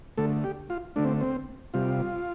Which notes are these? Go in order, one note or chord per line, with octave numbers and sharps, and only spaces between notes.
D3 A3 A4
G4
F4
D3 A3 D4
C4
C4
C3 G3 F4